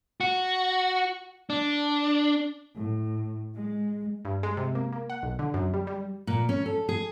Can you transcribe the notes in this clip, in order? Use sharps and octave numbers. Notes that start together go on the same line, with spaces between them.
F#4
D4
A2
G#3
G2
G#3
C3
A#3
A#3
F#5
B1
D3
F#2
G3
G3
A#2
C#4
A4
G#4